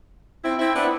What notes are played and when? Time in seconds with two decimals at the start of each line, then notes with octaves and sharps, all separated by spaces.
0.43 C4 E4
0.59 C4 E4
0.75 B3 D4